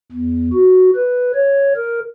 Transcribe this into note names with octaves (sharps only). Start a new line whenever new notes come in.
E2
F#4
B4
C#5
A#4